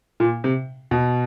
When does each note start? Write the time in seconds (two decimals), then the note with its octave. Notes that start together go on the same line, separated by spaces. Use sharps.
0.20 A#2
0.44 C3
0.91 B2